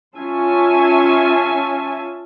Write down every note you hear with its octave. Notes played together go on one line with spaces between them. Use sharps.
C#4 F4 E5 G#5 A5